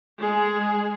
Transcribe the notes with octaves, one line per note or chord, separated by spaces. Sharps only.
G#3 G#4